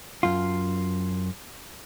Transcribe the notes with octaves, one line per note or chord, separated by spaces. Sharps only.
F#2 F4